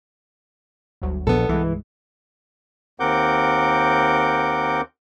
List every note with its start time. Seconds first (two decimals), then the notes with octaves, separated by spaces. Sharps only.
1.02 G1 D2 F#3
1.27 A#1 B3 A4
1.49 C2 G2 E3 G#3
3.00 D#2 C4 A#4 F#5 D6 G6